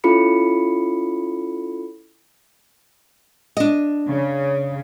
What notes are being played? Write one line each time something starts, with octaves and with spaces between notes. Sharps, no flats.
C#4 E4 F4 A4 B5 C#7
D4 D#5
C#3